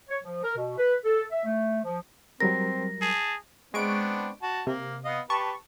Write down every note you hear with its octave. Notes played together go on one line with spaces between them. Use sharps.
C#5
F3
A#4
B2
B4
A4
E5
A3
F3
F#3 G3 C4 A#4 A#6
G#4 A5
G#3 B3 C4 D4 C#6 D7
F#4 A5
C3 A#3
B3 D#5 F5
G4 B4 A5 C#6